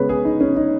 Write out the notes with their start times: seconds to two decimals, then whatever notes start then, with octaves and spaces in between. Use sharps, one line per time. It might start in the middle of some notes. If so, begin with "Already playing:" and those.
Already playing: C#3 G#3 B3 B4 C#5
0.09 G#4
0.25 D#4
0.41 C#4
0.56 D#4